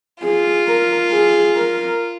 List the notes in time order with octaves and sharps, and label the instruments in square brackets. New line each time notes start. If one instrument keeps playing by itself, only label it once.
[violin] F4 [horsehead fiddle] G#4
[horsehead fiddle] A#4
G#4
A#4